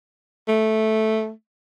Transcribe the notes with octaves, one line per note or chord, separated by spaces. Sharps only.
A3